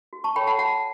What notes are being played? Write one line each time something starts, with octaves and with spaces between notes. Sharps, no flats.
F#4
A5 C#6
A4 C#5 G5 B5
F#5 A5
F#4 F#5 A5